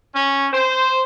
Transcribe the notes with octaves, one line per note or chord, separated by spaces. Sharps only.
C#4
C5